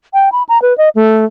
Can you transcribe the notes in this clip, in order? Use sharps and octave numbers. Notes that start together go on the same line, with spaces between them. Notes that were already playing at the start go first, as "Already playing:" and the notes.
G5
B5
A#5
B4
D#5
A3